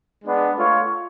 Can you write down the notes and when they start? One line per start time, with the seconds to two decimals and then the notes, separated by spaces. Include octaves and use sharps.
0.24 G#3 B3 D4
0.55 A3 F4 A4 C#5 F5